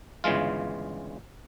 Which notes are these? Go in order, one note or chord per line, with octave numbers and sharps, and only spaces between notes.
G1 C#3 E3 G#3 F4